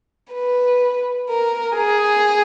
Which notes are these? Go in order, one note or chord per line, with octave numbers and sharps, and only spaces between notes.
B4
A#4
G#4